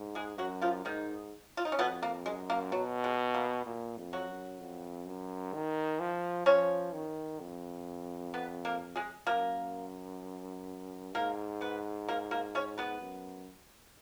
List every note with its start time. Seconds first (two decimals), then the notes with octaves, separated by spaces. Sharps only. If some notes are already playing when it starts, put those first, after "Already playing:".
Already playing: G#2
0.15 G#3 G#4
0.38 F#2 F#3 F#4
0.62 F3 F4
0.85 G#2 D#3 D#4
1.57 F4
1.65 D#4
1.72 C#4
1.79 F2 B2 B3
2.03 A#3
2.26 F#2 G#3
2.50 A#3
2.72 B2 F#3
3.04 G#3
3.34 A#3
3.66 A#2
3.98 F2
4.13 F#3 F#4
4.28 F#2
4.60 F2
5.06 F#2
5.53 D#3
6.00 F3
6.46 F3 C#4 C#5
6.94 D#3
7.40 F2
8.34 B3 B4
8.65 A#3 A#4
8.96 G#3 G#4
9.27 F#2 A#3 A#4
11.14 G#2 A#3 A#4
11.61 B3 B4
12.08 A#3 A#4
12.31 A#3 A#4
12.55 C#4 C#5
12.78 B3 B4
13.01 F#2